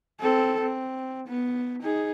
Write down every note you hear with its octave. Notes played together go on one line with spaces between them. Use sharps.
C4 A4
C4
B3
D#4 G#4